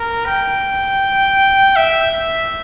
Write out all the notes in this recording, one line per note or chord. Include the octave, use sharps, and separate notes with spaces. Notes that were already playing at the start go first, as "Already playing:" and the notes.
Already playing: A#4
G5
E5